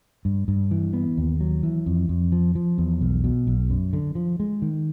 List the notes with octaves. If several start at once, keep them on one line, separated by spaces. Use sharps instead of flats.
G2
G2
E3
B3
D#2
F#3
E3
F2
F2
F3
F3
E2
B1
B2
B1
F#2
D3
F3
G#3
D#3